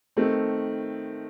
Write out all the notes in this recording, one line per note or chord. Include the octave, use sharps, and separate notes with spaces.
D#3 A3 C4